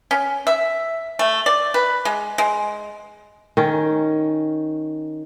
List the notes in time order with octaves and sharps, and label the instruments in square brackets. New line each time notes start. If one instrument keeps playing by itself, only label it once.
[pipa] C#4
E5
A3
D5
B4
G#3
G#3
[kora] D#3 C#4